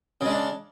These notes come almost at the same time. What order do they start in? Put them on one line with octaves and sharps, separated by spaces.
C#3 G#3 D4